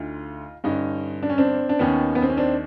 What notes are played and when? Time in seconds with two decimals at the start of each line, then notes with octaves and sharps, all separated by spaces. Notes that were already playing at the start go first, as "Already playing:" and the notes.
Already playing: D2 D3 D#4 F4
0.64 G2 D3 C#4 D#4
1.23 D4
1.30 C#4
1.38 C4 D4
1.69 D4
1.79 D#2 D#3 B3 C#4
2.15 B3
2.22 C4
2.30 C#4
2.37 C4 D4